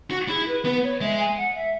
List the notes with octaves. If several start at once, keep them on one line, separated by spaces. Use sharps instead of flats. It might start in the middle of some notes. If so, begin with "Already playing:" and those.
F#4
E4 G#4
B4
B3 B4
C#5
G#3 E5
G#5
F#5
E5